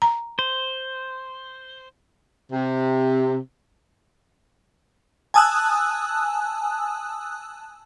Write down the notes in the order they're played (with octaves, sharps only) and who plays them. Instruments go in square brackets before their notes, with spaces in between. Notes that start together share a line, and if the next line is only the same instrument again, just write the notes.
[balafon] A#5
[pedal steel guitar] C5
[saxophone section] C3
[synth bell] G#5 A5 D#6 E6 F#6